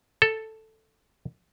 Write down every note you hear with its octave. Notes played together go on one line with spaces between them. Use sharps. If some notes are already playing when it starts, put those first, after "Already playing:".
A4